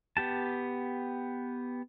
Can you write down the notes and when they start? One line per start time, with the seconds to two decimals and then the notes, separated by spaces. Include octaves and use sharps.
0.17 B3 G4 A5